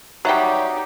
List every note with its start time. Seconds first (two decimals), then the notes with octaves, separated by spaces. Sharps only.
0.25 F#3 G3 D#4 F#4 G4 E5 F#5